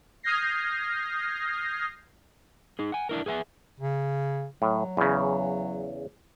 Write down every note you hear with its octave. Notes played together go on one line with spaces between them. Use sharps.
D#6 F6 G6 G#6 A#6 C7
D#4 G#4
F#5 G#5
D4 E4 A#4
G#4 B4 E5 G#5
C#3
A2 F#3
E2 C#3